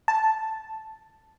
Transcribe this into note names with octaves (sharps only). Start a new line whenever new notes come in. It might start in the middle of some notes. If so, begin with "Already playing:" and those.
A5